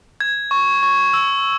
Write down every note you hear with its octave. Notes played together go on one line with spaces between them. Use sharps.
G#6
C#6
C#6
E6